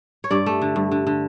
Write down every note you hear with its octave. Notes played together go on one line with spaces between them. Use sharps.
C#5
G2 D5
A3
D3
G2
D3
D3